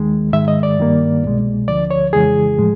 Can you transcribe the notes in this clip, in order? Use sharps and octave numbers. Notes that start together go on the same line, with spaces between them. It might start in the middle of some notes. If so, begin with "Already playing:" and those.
Already playing: D#2 D#3 G#3
G#2 D#3 G#3 E5
D#5
D5
G2 D#3 G3 A#3
C2 B2 G#3
D2 D3 F3 D5
C#5
F2 C#3 E3 G#3 G#4
A2 F3 G#3